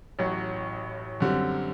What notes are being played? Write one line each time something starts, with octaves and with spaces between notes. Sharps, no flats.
A1 A2 F#3
F#2 D3 G3 C4